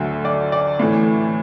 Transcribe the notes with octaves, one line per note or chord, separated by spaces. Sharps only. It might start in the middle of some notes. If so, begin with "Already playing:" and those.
Already playing: D2 D3 F#3 A3 E5
D5
D5
A2 E3 A3